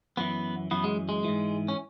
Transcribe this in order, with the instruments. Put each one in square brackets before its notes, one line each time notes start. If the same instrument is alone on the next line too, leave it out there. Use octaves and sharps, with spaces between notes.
[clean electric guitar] F#2 E3 B3
F#2 E3 B3
G#3
G#3
G#2 E3
C#4